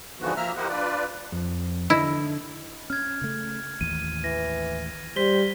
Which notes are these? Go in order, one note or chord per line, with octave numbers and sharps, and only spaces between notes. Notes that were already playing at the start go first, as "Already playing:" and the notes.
G#2 D3 E3 F3 B3 F#4
F3 A#3 E5 A#5 F6
E4 G4 A#4 C5 D#5 F#5
D4 F4 B4 D5
F2
D3 E4 D#5
C#4 F6 G#6
C#3 A3
A1 D#2 D#7
E3 A#6
G3 C5 B6 G7